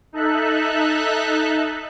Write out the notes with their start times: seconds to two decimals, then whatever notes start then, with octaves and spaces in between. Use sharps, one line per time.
0.13 D#4 A4 E5 F#6